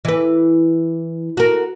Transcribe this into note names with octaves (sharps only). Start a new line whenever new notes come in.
E3 B4
F#4 A#4